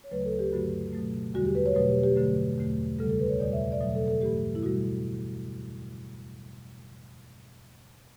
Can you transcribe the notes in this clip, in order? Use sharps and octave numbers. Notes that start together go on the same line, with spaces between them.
C#5
D2 C#3 F#3 A3 B4
A4
G4
G2 D3 F#3 A3 F#4
B2 F#3 A3
E2 D3 G3 F#4
G4
B4
C#5
B2 F#3 A3 B4
G4
G4
G2 D3 F#3 A3
E2 D3 A3
D2 C#3 G3 A4
A4
B4
C#5
E2 B2 G3 D5
E5
D5
B2 F#3 A3 E5
A4
A4
G2 E3 A3 G4
E4
B2 G3 F#4